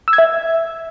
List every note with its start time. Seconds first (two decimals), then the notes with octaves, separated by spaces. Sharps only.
0.08 E6
0.13 G#6
0.18 E5